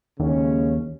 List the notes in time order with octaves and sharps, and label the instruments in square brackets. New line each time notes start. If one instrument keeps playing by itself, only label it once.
[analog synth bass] D#2 [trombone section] C#3 G#3 C#4